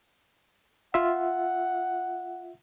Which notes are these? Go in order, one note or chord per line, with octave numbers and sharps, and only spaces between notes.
F4 E5 F#5